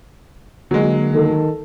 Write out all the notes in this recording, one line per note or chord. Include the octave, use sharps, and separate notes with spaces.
D3 F#3 G#3 A#3
D#3 A4